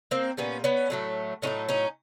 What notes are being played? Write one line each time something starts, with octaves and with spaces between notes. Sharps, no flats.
A#3 C4
A#2 G3 B3 C#4
B3 C#4
A2 F#3 A3
A2 F#3 A3 C#4 D#4
C#4 D#4